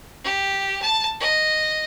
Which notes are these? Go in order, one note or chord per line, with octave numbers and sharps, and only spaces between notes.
G4
A5
D#5